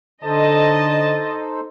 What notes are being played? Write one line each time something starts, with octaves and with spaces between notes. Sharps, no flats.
D3 D#4 A4 C5 D#5 A5